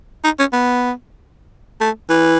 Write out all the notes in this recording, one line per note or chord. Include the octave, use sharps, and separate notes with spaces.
D#4
C#4
B3
A3
E3